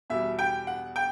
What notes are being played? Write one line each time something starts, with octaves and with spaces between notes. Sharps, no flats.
E2 B2 G3 E5
G5
F#5
G5